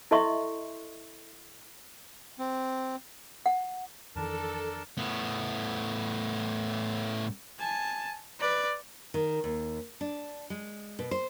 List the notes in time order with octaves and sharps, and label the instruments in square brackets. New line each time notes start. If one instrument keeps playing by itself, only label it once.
[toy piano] E4 A4 D#5 E5 C6 C#6
[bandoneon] C4
[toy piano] F#5
[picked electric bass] F2 D#3 E3 [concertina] D4 A#4 A5 [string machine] A4
[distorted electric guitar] A2 B3
[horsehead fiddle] G#5 A5
B4 D5
[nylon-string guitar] D#3
D#2
D4
G#3
B2
C5